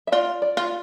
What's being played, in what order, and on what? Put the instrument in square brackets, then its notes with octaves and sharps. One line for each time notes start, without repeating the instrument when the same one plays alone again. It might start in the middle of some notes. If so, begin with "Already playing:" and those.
[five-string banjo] E5
[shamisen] F4 [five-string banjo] D5
[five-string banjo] D5
[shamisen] F4